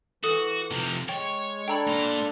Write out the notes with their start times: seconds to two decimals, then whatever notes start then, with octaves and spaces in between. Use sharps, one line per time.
0.24 E3 F#4 A4 D#6
0.71 C3 F3
1.09 G#3 C#5 G5
1.68 D4 A4 G5 A#5 B5
1.87 A#3 C6